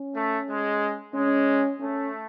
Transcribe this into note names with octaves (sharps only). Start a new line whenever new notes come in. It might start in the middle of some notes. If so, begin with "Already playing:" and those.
Already playing: C#4
A3
G#3
G#3 C#4
A3 C#4